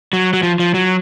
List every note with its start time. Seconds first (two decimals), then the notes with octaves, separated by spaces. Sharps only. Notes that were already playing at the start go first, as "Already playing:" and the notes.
0.13 F#3
0.33 F#3
0.43 F3
0.59 F3
0.74 F#3